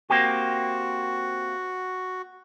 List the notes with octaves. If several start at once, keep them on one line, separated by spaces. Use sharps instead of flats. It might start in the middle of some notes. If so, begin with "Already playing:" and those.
A#3 C4 F#4 G4